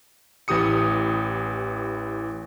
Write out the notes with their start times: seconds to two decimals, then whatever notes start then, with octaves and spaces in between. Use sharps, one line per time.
0.48 A1 E3 G4 D#6 C#7